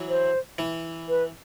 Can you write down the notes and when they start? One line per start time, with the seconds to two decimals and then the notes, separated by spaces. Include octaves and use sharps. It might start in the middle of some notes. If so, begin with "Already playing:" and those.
Already playing: E3 F#3
0.09 C5
0.58 E3
1.09 B4